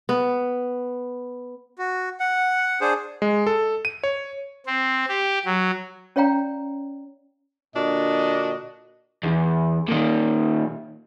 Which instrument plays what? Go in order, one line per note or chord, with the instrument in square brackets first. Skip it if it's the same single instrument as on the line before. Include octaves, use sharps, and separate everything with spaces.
[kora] B3
[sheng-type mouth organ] F#4
F#5
D4 G#4 C5
[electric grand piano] G#3
A4
D#7
C#5
[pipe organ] C4
G4
F#3
[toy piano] C#4 C#5 D5 F5 G5 A#5
[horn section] A#2 D3 D4 F#4 D#5
[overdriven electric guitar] E2
A#2 D#3